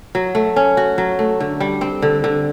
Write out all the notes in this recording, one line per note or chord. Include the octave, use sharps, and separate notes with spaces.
F#3
A3
C#4
F#4
F#3
A3
D3
G3
C4
D3
D3